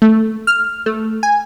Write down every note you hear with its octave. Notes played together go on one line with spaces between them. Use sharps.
A3
F6
A3
G#5